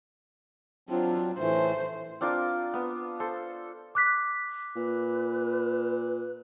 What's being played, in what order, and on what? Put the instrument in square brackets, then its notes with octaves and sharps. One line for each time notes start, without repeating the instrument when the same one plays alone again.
[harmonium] F#3 C4 D4 [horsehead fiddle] F4
[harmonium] A2 E3 A3 [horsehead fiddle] C5
[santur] C4 D4 F4 A#4
B3
A4 C5
[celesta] D6 F#6 B6
[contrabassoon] A#2 [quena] B4